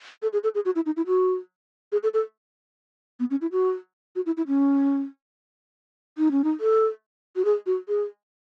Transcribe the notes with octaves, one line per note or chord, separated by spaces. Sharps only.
A4
G#4
A4
G#4
F#4
E4
D#4
E4
F#4
G#4
A4
A4
B3
C#4
E4
F#4
F#4
E4
E4
C#4
D#4
C#4
D#4
A4
F#4
G#4
F#4
G#4